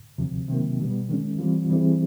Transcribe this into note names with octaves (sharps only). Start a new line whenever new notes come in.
D2 C3 F3
C3 D#3 F#3 A#3
B2 G3 B3
D#3 G#3 C#4
E3 G3 C4 F4
E3 G3 C4 E4 G#4